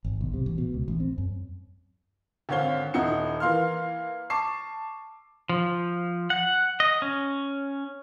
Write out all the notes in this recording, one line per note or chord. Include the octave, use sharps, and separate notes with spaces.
G#1
B1
C3
A1
B2
C#2
A1
C4
F#2
G#1 D3 C4 C#5 F5 G7
D#1 D#4 E4 F#5 C#7
E3 A#3 F5 C6 F6
A5 C#6 D6 C7
F3
F#5
D#5
C#4